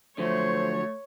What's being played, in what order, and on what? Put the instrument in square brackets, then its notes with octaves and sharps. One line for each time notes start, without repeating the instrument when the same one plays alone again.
[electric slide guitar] D3 F3 F#3 [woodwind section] A3 [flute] C5 [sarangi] C#5